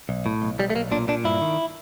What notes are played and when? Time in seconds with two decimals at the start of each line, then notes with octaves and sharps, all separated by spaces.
0.09 B1
0.26 A2
0.42 B1
0.59 B1 G3
0.70 A3
0.75 B1 A#3
0.92 A#2 D4
1.08 A#2 D4
1.24 G2 E4
1.41 D#3